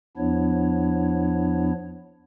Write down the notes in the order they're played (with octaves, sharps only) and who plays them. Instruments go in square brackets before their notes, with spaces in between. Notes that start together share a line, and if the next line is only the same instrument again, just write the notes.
[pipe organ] E2 F3 B3 D4 E4 C#5